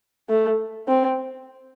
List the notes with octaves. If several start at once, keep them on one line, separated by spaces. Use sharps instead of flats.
A3
C4